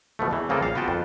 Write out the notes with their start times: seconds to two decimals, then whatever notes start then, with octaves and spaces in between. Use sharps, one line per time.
0.19 B2 F3 A3
0.31 E2 E3
0.49 C#3 A#3 C4 G#4 A4
0.63 A#1 F5
0.75 B3 F4 F#4 G5 A5
0.88 F2